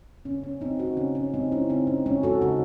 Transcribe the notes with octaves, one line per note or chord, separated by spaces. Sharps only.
C#3 C#4
C#4
G#3 C4 D#4
D#4 F#4
C#3 C#4
C#4
G#3 C4 D#4
C#4 E4
C#3 C4 D#4
C#4
G#3 C#4
F#4 A4
C#3 D#4 F#4